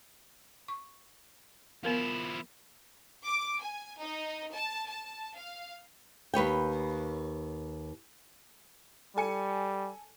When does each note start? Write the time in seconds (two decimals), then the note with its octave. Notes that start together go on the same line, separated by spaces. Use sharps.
0.68 C#6
1.83 F3 B3 E4 A#4 F5
3.24 D6
3.61 G#5
3.99 D#4
4.54 A5
4.88 A5
5.36 F5
6.34 D#2 B4 C#5 G5
9.17 G3 A4 G#5 C#7